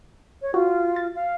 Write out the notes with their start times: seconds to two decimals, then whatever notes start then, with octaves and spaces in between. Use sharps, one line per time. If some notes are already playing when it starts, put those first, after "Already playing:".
0.42 C#5
0.54 F4 F#4
0.96 A6
1.15 F5